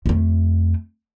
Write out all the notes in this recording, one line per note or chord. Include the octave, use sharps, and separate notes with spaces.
F2 A3